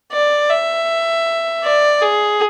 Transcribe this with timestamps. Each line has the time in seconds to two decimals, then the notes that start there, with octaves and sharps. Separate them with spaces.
0.12 D5
0.50 E5
1.64 D5
2.02 G#4